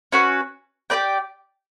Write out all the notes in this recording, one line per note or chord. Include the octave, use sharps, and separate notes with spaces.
C#4 F#4 B4
G4 B4 D5 G5